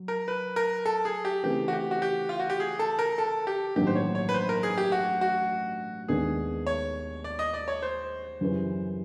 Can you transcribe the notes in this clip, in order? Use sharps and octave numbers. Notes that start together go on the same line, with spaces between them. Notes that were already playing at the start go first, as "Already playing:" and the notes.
Already playing: F#3
A#4
B4
A#4
A4
G#4
G4
C#3 E3 A3 C4 G4
F#4
G4
F#4
G4
F4
F#4
G4
G#4
A4
A#4
A4
G4
A1 G2 D#3 F#3 A#3 G4
C5
C#5
C#5
B4
C5
A#4
G#4
G4
F#4
F#4
D#2 D#3 G#3 B3 D4 G#4
C#5
D5
D#5
D5
C#5
C5
F#2 C#3 E3 G3